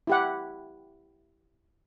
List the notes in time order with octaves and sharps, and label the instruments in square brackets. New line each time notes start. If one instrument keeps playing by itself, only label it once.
[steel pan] E4 G4 F#5